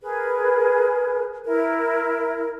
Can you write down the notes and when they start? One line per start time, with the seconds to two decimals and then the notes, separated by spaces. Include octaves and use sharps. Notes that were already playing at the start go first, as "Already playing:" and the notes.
0.02 G#4 A#4 B4
1.45 E4 A#4